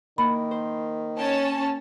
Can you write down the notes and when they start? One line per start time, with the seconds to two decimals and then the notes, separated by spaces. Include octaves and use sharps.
0.18 D#3 A#3 E4 B5
0.51 C5
1.19 C#4 G5 A5